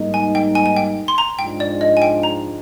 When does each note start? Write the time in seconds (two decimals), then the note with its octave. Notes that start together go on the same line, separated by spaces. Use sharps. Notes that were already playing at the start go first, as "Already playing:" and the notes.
Already playing: G#2 G3 A#3 D#4
0.14 G#5
0.35 G5
0.55 G#5
0.66 G#5
0.76 G5
1.08 C6
1.18 A#5
1.38 G#2 F3 G#3 D4 G5
1.60 D5
1.81 D#5
1.97 G#5
2.02 G5
2.23 A#5